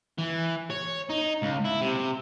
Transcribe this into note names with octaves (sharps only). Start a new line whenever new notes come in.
E3
C#5
D#4
C#2
E4
C3